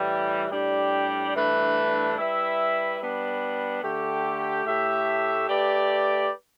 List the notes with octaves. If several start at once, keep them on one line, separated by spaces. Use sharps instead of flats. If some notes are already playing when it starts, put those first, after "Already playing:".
Already playing: A2 E3 G3
A2 G3 D4 G4
G2 E3 A3 D4 B4
G3 E4 B4 E5
G3 B3 D4
D3 A3 G4
A2 A3 G4 E5
A3 G4 B4 D5